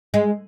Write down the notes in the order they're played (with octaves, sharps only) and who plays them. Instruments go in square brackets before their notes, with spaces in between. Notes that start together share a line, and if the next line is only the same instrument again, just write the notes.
[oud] G#3